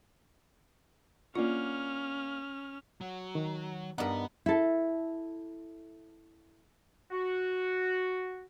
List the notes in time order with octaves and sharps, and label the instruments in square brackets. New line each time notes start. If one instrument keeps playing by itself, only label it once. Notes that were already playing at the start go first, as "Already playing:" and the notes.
[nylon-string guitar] A#3 D5 F#5 [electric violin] C#4 F6 [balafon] D4 F4
[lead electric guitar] F#3
[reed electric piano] D#3
[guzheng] G2 D#4 [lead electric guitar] B3 [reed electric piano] A#4 D5 F#5
[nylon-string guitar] E4 A4
[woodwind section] F#4